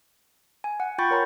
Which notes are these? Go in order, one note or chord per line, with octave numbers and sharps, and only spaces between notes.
G#5
F#5
F4 G5 B5 C#6 G6 A6
A#4 C#5 A#5 C6